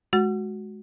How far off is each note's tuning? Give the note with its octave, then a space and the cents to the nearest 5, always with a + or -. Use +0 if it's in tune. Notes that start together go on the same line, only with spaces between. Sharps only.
G#3 +20 F#4 +0